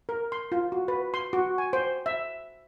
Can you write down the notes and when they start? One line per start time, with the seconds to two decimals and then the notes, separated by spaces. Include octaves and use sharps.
0.09 A#4
0.32 C6
0.52 F4
0.72 F#4
0.88 B4
1.14 C6
1.33 F#4
1.58 G#5
1.73 C5
2.06 E5